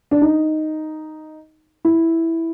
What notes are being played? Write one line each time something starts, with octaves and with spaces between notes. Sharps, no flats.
D4
D#4
E4